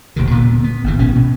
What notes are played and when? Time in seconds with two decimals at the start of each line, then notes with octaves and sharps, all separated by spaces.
0.16 D#1 D#2 C3 D#3
0.31 A#2 D3 B3
0.64 B3
0.84 G1 G2 E3
0.98 A#1 B2 B3 C#4
1.16 B2